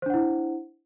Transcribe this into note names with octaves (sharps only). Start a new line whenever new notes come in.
D4 E4 C5 F#5